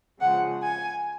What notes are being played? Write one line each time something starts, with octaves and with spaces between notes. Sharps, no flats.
C#3 F3 G#3 F#5
G#5